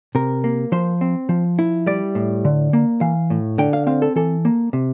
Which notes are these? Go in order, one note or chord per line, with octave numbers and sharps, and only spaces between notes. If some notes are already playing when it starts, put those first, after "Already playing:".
C3 A#4
A#3
F3 C5
C4
F3
E4
G3 D5
A2
D3
A#3
E3 F5
A2
D3 G5
F5
C4 F5
A4
E3 A4
A#3
C3